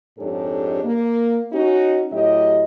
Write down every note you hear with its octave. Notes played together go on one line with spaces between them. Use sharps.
F2 G#2 D4 G4 A4 C#5
A#3
C#4 D#4 F#4
A2 F#3 E4 G4 D#5